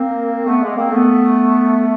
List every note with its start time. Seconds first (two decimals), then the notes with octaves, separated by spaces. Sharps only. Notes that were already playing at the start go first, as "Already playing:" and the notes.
Already playing: A#3 C4
0.46 A3 B3
0.62 G#3 A#3
0.76 A#3 C4
0.91 A3 B3